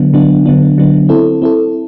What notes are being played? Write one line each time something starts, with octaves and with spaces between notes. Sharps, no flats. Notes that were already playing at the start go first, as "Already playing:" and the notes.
Already playing: D3 F#3 B3 D4
D3 F#3 B3 D4
D3 F#3 B3 D4
D3 F#3 B3 D4
C4 E4 A4
C4 E4 A4